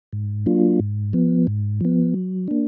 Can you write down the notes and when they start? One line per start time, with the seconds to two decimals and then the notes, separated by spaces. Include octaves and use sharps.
0.13 G#2
0.46 F#3 A#3 D4 F4
0.80 G#2
1.13 F3 B3
1.47 G#2
1.81 F3 B3
2.14 F#3
2.48 A#3 D4